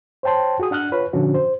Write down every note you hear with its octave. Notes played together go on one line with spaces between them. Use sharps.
C5 C#5 G5 A5 C6
F#4 G#4 D#6
D4 F#5 F6 F#6
F4 B4 C#5
A#2 D3 F3 C#4 D4 F#4
C5